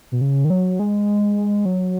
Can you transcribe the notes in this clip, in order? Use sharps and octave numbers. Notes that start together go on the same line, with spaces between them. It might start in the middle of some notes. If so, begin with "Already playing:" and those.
B2
C#3
D#3
F#3
G#3
F#3